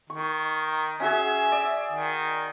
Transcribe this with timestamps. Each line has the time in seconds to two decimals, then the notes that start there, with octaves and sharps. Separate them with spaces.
0.10 D#3 C#6
1.00 C#4 F#4 G#4 E5
1.52 D5
1.92 D#3